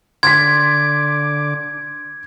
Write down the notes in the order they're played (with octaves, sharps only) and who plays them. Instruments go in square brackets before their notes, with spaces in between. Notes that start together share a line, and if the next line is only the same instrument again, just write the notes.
[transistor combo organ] D3 D6 [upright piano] C6 A6 B6 [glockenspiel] G#6